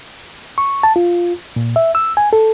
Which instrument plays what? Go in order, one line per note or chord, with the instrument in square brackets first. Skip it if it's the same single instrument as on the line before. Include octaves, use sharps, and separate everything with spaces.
[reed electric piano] C#6
A5
F4
A#2
E5
E6
G#5
A4